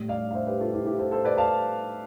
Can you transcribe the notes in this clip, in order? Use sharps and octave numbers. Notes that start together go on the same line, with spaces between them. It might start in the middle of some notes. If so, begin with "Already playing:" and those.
Already playing: A2 G3
D5 F5
F5
C5 E5
G4 B4
F4 A4
E4 G4
E4 G4
A4 C5
A4 C5
B4 D5
F5 A5